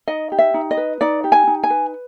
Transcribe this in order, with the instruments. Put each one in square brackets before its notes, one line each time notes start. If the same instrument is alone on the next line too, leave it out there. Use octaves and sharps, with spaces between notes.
[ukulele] D#4 D#5
G4
E5
D#4
D#5
B4
D#4 D5
G4
G#5
D#4
G#5
B4